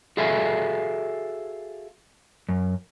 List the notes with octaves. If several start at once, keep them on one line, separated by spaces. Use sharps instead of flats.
F#4 G#4 A4 E5 F5 G#5
F#2